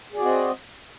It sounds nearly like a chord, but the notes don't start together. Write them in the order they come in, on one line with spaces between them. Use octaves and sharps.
G#4 D5 F#4 C4 D#5